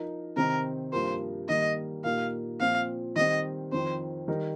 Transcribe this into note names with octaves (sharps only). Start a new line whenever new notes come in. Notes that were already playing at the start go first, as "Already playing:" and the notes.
Already playing: F3 D#4 A#4
C3 D#3 C4 D#4 A#4
G2 F3 A#3 G4 A#4 C5
D#3 G3 A#3 D#5
A#2 A#3 D#4 G4 A#4 F5
A#2 F3 C4 F5
D#3 G3 C4 D#5
F2 D#3 C4 C5
D#3 G3 D#4 A#4